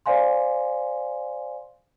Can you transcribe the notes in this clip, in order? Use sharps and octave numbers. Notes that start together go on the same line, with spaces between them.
C5 D5 F5 G#5 C6